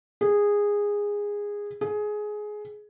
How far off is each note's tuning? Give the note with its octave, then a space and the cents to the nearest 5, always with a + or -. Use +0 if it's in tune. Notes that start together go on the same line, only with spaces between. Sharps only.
G#4 -15
G#4 +15